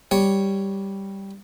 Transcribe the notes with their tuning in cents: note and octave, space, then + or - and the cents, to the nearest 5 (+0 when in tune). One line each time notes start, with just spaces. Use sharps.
G3 +0 C#5 +0